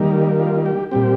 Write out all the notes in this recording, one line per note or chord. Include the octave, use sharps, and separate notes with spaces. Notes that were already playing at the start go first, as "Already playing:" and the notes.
Already playing: D#3 G3 A#3
F4
G4
A#2 G3 C4 G4